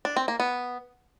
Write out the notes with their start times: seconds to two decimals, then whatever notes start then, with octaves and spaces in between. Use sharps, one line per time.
0.05 D4
0.16 C4
0.28 A#3
0.40 B3